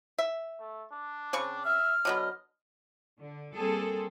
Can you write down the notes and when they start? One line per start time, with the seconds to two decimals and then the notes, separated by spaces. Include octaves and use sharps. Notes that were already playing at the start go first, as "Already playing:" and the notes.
0.18 E5
0.60 A3
0.91 D4
1.33 C#3 C4 C#6
1.65 E5 F6
2.05 D3 F#3 B3 D#5
3.20 D3
3.54 G3 A#3 C4 G#4 A4